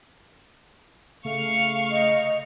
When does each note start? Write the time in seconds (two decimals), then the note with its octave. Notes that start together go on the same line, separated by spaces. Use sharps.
1.25 C#3 A3 F5 C#6 F6
1.91 D#5